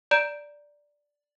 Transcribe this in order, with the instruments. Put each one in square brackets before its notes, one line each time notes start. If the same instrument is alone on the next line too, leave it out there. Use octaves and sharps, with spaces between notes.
[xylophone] D5 A#5 G6 D7 E7